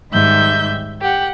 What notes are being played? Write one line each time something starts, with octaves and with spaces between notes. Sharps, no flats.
G#2 D#3 G3 E5 G6
G4 F#5